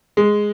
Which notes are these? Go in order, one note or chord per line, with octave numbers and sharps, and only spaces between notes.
G#3